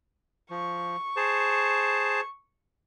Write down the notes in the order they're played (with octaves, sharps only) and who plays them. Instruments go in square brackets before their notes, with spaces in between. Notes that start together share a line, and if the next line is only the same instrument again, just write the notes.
[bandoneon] F3 [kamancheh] C#6
[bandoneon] G#4 C5 A5